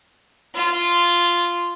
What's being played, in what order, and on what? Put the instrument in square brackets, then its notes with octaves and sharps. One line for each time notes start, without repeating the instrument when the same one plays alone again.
[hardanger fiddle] F4